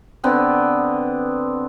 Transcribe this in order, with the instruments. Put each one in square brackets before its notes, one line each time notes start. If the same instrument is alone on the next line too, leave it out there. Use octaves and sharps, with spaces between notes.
[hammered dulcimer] D3 B3 C4